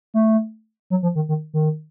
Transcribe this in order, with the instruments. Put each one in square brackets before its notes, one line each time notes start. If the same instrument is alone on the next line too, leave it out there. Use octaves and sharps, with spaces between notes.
[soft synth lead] A3
F#3
F3
D#3
D#3
D#3